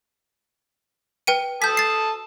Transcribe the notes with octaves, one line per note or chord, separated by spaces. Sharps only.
B4 G5 D#7
A4 A5 D#6 G6 B6
A6 C7